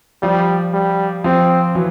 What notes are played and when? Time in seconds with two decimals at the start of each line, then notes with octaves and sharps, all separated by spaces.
0.22 F3 G3
0.73 G3
1.24 F3 C4
1.75 E3 F#3